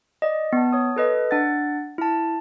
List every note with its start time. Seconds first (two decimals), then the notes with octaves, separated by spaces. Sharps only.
0.22 D5 D#5
0.53 B3 A5
0.73 C#5 D#6
0.96 A4 B4 D#5
1.31 D4 F#5 A6
1.98 E4 A5